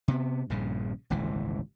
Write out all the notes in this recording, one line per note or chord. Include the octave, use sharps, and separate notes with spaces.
C3 B3
A#1 G2 A#2 C#3
D#1 G#1 C#2 E3